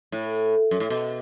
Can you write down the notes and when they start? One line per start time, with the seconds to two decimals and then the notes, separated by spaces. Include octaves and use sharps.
0.12 A2
0.71 F#2
0.80 A2
0.90 B2